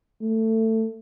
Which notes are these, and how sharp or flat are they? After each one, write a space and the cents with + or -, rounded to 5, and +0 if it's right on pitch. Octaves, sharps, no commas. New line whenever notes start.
A3 +15